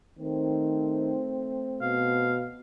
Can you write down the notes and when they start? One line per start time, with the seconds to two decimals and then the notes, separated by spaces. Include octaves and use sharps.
0.19 D#3 A3 C4
1.81 B2 F5